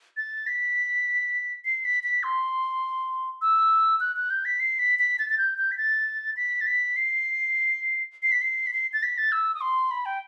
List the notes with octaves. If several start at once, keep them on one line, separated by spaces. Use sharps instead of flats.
A6
B6
C7
B6
B6
C6
E6
F#6
F#6
G6
B6
C7
B6
B6
A6
A6
G6
G6
B6
A6
B6
A6
B6
C7
C7
B6
C7
B6
C7
A6
B6
A6
E6
D#6
C6
B5
G5